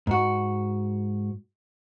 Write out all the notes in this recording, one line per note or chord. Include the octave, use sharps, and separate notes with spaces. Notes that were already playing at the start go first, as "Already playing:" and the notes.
G#2 F#4